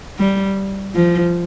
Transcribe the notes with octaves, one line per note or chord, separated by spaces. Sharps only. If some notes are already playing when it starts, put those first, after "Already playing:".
G3
F3